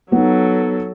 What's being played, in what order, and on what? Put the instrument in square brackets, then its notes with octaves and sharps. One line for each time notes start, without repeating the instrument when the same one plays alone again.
[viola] F#3 A4 [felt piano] B3 D#4